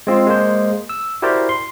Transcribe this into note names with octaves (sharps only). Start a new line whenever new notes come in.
G#3 C4 F4
G#3 A#3 C5
E6
E4 F#4 G4 A#4 C5 D5
C6